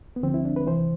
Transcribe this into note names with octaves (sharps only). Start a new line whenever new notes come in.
B3
D2 D3 F3 C4
E4
D4
B4
C2 C3 E3 C5